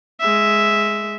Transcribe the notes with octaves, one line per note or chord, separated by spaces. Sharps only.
G#3 E5